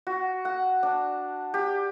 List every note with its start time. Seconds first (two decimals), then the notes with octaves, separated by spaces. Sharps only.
0.07 F#4
0.45 F#5
0.83 D4
1.54 G4